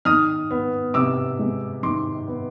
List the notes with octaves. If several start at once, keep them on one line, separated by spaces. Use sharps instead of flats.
D#3 D#6 F6
B3
C3 D6 E6
G#3
D#3 C6 D6
B3